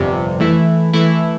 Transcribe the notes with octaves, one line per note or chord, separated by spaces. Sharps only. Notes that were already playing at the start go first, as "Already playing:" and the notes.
Already playing: G1 F2 C3 G3
E3 A3 E4
E3 A3 E4